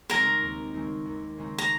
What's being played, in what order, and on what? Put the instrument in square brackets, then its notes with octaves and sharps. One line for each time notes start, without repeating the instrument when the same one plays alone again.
[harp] C#3 G#3 C4 D#4 [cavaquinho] A#4 A#5
[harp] D#2
C#3 G#3 C4 D#4
D#2
C#3 G#3 C4 D#4
[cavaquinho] A#5